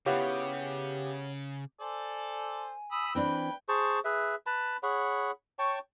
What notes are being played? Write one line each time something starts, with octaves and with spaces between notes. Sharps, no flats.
C#3 B3 E4 F4 G4 C#5 F#5
A4 C5 D5 G#5
B5 D#6 E6
E3 C4 D4 B4 G5 B5
G#4 C5 A5 C#6
G#4 B4 E5
B4 A5 B5
G#4 C#5 F#5 B5
C#5 G5 A5 C#6